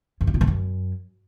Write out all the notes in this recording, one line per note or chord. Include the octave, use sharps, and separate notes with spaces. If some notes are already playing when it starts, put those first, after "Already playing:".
F#2
G2
A#2
G#2
F#2